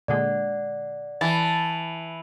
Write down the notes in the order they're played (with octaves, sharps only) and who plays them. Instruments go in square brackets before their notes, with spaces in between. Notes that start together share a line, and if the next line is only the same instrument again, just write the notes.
[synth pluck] A#2 D3 G#3 [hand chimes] D5 F#5
[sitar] E3 [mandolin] A5